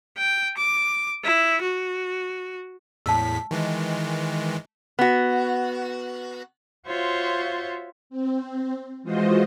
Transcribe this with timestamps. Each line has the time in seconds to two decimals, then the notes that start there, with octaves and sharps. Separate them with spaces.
0.18 G5
0.57 D6
1.23 E4
1.62 F#4
3.06 E2 A2 A5 E6 B6
3.51 D#3 E3 G#3
4.99 B3 F#4
6.87 F4 F#4 C5 C#5 E5
8.10 C4
9.03 E3 G#3 F4 F#4 C5 D#5